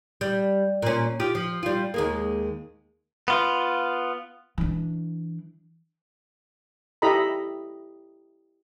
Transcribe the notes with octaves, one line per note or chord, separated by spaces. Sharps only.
G3
A#2 C#4
F4 G4
F3
G3 F4
D#2 G#3 A#3
B3 F4
E3 D4
E4 G4 A4 D#5 A#5 B5